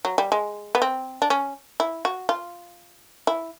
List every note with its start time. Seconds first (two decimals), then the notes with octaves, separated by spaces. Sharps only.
0.05 F#3
0.18 G3
0.32 G#3
0.75 B3
0.82 C4
1.22 D4
1.30 C#4
1.80 E4
2.05 F#4
2.29 F4
3.27 E4